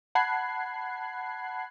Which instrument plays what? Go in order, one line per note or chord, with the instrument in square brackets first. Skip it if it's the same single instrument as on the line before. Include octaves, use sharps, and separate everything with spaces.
[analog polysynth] F#5 A5 B5 F#6 G#6 C7